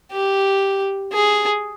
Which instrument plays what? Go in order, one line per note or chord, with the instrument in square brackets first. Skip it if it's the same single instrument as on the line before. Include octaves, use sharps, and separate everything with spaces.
[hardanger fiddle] G4
G#4